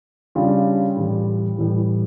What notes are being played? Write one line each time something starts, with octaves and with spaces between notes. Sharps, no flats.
C#3 G3 D4 F4
A2 E3 G3
A2 E3 G3